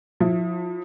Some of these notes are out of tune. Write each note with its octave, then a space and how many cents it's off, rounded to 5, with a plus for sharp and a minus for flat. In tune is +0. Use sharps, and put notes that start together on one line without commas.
F3 +30 E4 +0